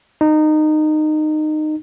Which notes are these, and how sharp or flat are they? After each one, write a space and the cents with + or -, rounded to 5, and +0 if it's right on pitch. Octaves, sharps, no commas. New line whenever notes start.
D#4 -20